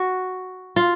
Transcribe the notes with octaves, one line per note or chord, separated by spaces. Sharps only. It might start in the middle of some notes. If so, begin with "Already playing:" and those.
Already playing: F#4
F4